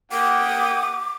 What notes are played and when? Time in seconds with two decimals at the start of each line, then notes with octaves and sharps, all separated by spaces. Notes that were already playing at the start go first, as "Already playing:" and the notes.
0.12 A#3 E5 F#5 G5 D6 D#6